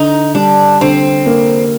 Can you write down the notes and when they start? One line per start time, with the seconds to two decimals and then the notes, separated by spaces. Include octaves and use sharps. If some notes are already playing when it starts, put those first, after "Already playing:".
Already playing: D3 D#4
0.35 G3 D4
0.81 D3 C4
1.26 A#3